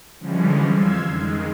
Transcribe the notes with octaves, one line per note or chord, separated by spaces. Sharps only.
D3 E3 F3 G3 G#3 C#4
F2 F5 C6 E6 G#6
D#3 G#3